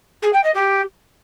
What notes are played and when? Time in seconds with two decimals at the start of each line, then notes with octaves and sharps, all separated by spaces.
0.22 G#4
0.32 G5
0.43 D#5
0.54 G4